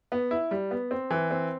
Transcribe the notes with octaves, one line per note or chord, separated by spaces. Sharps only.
B3
E4
G3
B3
C4
E3
C4